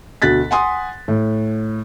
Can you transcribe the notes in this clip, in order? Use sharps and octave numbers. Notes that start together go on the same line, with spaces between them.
D2 B2 F#6 A6 B6
F#5 G#5 C6 D#6
A2